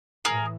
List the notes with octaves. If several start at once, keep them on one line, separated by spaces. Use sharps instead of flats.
A2 E3 G#4 A#4